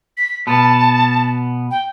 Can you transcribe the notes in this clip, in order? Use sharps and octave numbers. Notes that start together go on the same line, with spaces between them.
B6
B2 B3 A5
G5